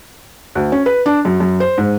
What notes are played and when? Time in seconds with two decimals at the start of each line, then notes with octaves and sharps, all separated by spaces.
0.55 D2
0.72 C#4
0.86 B4
1.06 D4
1.25 F#2
1.40 F#2
1.60 C5
1.78 G#2